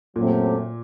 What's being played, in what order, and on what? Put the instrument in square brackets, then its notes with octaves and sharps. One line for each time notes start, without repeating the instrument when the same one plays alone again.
[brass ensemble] F#2 F#3 A3 C4 G4 [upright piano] A#2